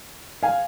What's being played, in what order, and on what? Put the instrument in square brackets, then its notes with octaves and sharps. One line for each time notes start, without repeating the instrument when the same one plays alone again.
[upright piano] F5 G#5